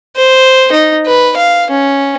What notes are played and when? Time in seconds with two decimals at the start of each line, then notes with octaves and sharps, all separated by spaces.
0.16 C5
0.72 D#4
1.06 B4
1.36 F5
1.70 C#4